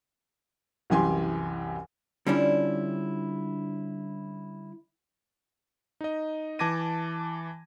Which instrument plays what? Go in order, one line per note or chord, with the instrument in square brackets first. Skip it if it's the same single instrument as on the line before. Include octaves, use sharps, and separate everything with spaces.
[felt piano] C2 F#2 E3 G4 G#5 C6
[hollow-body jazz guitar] D3 G3 C#4 D4 E4 F4
[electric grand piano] D#4 D#5
E3 A5 D6 G#6 A#6 D#7